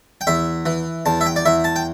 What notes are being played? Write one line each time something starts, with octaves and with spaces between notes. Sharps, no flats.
G5
E2 E5
E3
E2 A5
E5
G5
D5
E2 E5
A5
G5